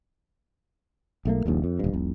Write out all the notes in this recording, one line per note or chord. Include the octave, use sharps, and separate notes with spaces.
B1 A3 A#3
D#1 A#1 D#2
F2
D#1 G2
F1 C2